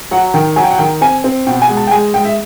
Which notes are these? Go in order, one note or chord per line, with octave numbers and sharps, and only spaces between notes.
F#3 F#5
D#3 G5
F#3 G#5
G5
F#5
D#3 G5
C4 G#5
C4
B2 G5
G#5
G#3
A5
G5
G#3 G#5
G#3 G5
E5